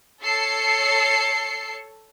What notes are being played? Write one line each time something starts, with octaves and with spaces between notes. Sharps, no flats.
A4 C#5 C7 C#7